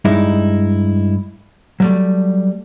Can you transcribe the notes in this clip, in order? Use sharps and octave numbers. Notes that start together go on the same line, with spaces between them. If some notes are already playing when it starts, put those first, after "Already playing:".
G2 G#3 D#4 E4
F#3 G3 A3